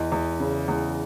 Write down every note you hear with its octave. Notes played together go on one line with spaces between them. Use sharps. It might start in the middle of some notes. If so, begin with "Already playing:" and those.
Already playing: E2 D#5
E2
C#3
E2